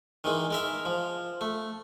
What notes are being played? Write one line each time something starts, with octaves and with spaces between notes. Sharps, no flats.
D#3 E3 G#3
G#3 A#4 E5
F3
A3